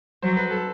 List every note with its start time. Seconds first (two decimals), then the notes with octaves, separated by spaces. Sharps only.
0.22 F#3 C5
0.37 B4
0.51 A4